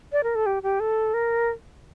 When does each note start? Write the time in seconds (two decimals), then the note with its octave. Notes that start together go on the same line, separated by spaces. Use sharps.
0.12 D5
0.23 A#4
0.35 A4
0.46 G4
0.63 G4
0.80 A4
1.14 A#4